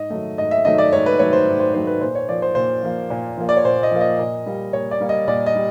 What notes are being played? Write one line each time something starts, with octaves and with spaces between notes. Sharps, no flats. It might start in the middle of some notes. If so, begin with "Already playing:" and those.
Already playing: G#2 D#5
D#3 F#3 A3
G#2 D#5
E5
D#3 F#3 A3 D#5
D5
G#2 C#5
B4
D#3 F#3 A3 C#5
C5
G#2
C5
D#3 F#3 A3 C5
B4
A#2 C5
C#5
F3 A#3 D5
C5
A#2 C5
F3 A#3
A#2
F3 A#3
D5
C#5
A#2 C5
D#5
F3 A#3
D#5
A#2
G3 A#3
A#2 C#5
D5
G3 A#3
D#5
A#2 D5
D#5
G3